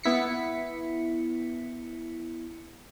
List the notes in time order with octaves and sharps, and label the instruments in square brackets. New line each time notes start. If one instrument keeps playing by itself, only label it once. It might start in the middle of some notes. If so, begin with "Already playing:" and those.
[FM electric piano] B3 E4 B6 C#7